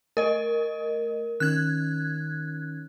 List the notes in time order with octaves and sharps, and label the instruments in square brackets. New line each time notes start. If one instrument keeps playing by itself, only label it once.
[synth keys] A3 [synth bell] A#4 D#5
[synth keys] D#3 C#4 [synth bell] F#6 G#6